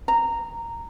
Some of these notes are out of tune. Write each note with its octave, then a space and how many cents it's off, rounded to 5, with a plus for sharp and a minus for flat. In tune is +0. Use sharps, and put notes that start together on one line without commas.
A#5 -10